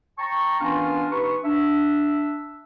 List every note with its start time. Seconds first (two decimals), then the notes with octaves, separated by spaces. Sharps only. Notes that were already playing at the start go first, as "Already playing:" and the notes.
0.18 G5 A5 A#5 C#6
0.61 E3 B3 C#4 D4 F4 A#4
1.11 D#4 G4 B4 C#6
1.44 D4 E5